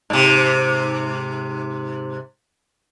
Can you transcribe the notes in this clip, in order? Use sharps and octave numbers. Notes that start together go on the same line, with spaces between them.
G#2 C3